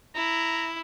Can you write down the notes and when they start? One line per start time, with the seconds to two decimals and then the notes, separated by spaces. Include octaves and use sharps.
0.15 E4 A#5